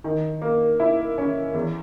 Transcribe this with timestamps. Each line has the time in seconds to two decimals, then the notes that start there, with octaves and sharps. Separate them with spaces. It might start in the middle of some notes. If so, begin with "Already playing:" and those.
0.04 D#3
0.42 A#3
0.80 E4
1.18 C#4
1.54 E2